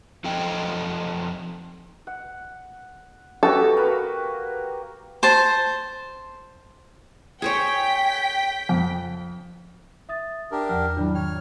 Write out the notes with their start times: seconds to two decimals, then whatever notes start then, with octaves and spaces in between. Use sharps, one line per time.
0.24 F3 C4 D#4 A4 G5
2.07 F#5
3.43 B3 F#4 G4 A4
3.77 A#3 B4
5.23 C5 A5
7.42 G#4 C5 C#5 G5 B6
8.69 F2
10.09 E5 D#6 A6
10.52 D4 G4 A#4
10.69 E2 F3 F#5 F6
10.97 G#2 D#3 F#3 G3 D4 E4
11.15 C#5 G5 F6